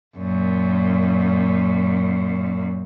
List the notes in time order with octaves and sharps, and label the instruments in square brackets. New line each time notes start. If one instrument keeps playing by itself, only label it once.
[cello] F#2 A#2